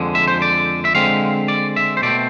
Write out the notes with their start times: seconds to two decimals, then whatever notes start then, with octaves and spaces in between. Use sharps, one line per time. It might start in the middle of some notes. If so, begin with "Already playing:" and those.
Already playing: F2 D3 G#3
0.15 E5
0.28 C5
0.42 D5
0.85 E5
0.95 D3 G#3 C4 F5
1.48 D5
1.76 E5
1.97 C5
2.02 B2 A3 C4 D5